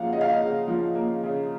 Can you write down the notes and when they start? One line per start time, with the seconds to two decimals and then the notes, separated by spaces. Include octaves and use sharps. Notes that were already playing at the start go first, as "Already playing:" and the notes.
Already playing: C#3 F3 A#3 F5 F#5
0.12 C#3 D#5
0.21 F5
0.30 D#5
0.40 C#3
0.68 F3
0.95 A#3
1.23 C#3